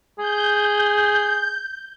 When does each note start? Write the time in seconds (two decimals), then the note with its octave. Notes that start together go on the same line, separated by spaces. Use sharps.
0.19 G#4 G6